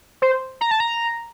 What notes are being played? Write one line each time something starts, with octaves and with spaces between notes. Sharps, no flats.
C5
A#5
A5
A#5